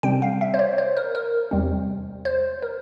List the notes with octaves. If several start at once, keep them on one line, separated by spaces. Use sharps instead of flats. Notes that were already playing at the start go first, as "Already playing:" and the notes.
C3 G3 C4 G5
F5
E5
C5
C#5
C5
A#4
A#4
E2 C3 G3 C4
C5
A#4